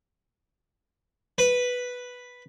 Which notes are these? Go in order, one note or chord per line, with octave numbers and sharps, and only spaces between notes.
B4